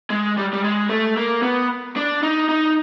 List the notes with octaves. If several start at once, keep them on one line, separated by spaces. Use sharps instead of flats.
G#3
G3
G3
G#3
A3
A#3
B3
D4
D#4
D#4